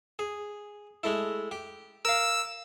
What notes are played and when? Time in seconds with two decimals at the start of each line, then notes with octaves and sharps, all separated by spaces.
0.19 G#4
1.03 G#3 A3 E4
1.51 G4
2.05 A#4 F5 E6